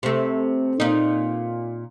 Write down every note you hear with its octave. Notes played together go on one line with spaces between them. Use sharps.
C3 A3
A#2 D#4